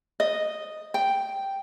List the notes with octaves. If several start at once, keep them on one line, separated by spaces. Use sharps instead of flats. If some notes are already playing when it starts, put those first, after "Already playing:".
D#5
G5